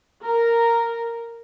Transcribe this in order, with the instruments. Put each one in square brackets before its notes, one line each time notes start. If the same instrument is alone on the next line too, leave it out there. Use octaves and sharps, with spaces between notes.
[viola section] A#4